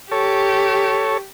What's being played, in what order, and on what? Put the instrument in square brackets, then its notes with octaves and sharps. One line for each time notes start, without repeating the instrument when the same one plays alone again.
[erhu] G4 [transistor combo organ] A4 C#5